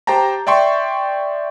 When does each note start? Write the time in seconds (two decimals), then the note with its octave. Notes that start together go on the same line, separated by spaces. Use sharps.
0.07 G4 C5 G5 A5 A#5
0.47 D5 E5 G5 C6 C#6